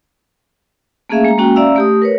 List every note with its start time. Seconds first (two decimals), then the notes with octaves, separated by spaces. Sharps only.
1.10 A3 A#3 C#4 G#4 E5 F5
1.25 G#3 A#5
1.38 G#3 A#3 C#4 F#4 G5
1.56 C#4 D5 E5 F5 A#5 E6
1.76 A3 G4 D#6
2.02 A#4 B4 C#5